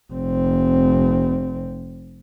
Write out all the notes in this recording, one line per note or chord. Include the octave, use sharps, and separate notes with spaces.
F1 C4